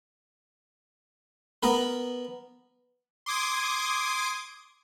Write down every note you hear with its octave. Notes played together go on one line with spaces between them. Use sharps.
B3 A#4 B4
C6 D6 D#6 G#6 D7